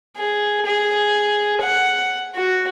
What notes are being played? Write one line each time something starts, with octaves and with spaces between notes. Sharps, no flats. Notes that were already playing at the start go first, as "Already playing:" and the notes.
G#4
G#4
F#5
F#4